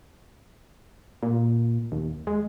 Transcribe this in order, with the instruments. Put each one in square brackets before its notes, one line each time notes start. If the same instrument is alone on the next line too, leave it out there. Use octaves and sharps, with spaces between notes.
[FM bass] A#2
D#2
G#3